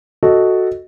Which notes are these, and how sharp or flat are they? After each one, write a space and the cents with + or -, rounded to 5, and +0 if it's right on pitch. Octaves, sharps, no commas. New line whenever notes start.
F#4 +0 A4 +0 D#5 +5